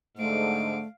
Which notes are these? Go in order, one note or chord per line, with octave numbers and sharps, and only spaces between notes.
G#2 D3 A3 F5 D7